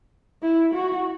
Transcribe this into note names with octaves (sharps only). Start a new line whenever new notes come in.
E4
F#4